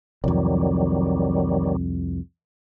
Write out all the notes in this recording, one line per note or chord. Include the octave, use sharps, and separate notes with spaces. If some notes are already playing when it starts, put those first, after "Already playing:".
C2 F2 D#3 F#3 G3